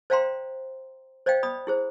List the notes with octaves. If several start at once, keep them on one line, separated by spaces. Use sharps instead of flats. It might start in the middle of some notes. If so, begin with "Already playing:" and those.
C5 D5 F5 G5 A#5 C6
C5 D5 D#5 F5 G5
D5 B5 D#6
E4 G#4 C5